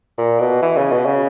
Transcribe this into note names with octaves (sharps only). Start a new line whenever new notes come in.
A#2
B2
E3
C#3
B2
C#3